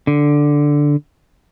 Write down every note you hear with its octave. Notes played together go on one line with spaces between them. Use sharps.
D3